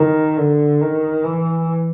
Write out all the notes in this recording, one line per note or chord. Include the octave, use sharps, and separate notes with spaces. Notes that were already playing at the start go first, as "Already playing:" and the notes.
Already playing: D#3
D3
D#3
E3